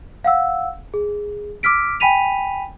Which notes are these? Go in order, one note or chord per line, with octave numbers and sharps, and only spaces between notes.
F5 F#5 E6
G#4
D6 E6 F6 B6 D7
G5 G#5 B5 B6 D#7 F7